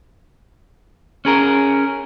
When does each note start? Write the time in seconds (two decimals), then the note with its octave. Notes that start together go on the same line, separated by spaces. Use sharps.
1.25 C#4 G#4 A#4